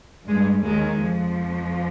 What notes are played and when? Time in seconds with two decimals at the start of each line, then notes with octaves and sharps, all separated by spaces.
0.28 G2 G3 G#3
0.63 D#2 D#3 G#3
1.00 F2 F3